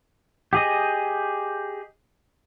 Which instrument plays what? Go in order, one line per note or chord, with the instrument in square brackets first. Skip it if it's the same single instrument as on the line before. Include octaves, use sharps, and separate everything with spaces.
[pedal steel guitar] G4 G#4 D#5